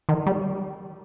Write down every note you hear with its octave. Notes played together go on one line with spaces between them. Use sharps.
D#3
G3